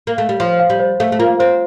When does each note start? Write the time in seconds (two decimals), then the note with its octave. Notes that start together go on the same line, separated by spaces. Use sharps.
0.07 A#3
0.18 A3
0.29 G3
0.40 F3 F5
0.60 F5
0.70 G3
0.80 C5
1.00 A3 F5
1.12 A3
1.19 A#3 F4
1.40 C4 C5